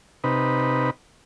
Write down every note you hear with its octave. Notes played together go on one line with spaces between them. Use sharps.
C3 D#4 B4